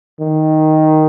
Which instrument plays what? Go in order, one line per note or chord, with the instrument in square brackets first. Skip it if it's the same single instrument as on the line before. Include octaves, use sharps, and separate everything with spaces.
[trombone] D#3